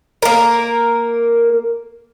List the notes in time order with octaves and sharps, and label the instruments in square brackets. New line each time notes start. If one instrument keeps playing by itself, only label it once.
[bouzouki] A#3 A#4